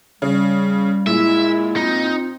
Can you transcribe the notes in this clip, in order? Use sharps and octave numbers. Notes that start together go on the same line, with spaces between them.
C#3 G3
A#2 G#3 E4 E5
C4 D#4 F4